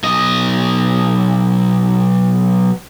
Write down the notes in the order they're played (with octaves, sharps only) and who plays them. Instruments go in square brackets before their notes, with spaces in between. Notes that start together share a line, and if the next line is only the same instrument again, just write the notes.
[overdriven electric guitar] B1 D#5